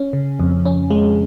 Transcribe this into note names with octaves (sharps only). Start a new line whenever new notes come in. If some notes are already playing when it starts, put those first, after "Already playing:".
Already playing: C#4
C#3
F2
C#4
G#3